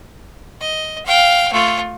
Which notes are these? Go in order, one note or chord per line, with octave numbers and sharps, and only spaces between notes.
D#5
F5 G5
A3 F4